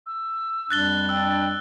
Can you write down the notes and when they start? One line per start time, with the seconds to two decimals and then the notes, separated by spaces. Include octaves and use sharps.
0.06 E6
0.70 F2 G3 D4 F#6 A6 G7
1.09 G5 E6